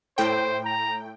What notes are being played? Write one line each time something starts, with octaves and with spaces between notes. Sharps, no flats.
A2 C5 G5
A#5